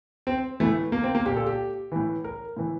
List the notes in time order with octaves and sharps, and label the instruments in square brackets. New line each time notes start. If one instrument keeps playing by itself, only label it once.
[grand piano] C4
A2 E3 A3
A#3
C4
A#3
A#2 G4
A4
G4
A2 E3
A#4
A2 E3